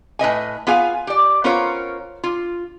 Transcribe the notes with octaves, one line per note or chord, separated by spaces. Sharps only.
A2 B4 D#5 G#5
B3 F4 G#4 F5 G#5
G4 D5
B3 C#4 F4 A#4 C5 C#5
F4